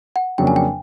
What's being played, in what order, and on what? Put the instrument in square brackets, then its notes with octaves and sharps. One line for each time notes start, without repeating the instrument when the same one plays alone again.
[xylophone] F#5
[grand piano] F2 C#3 F#3 A#3 D4 [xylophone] G5
[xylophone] G#5
G5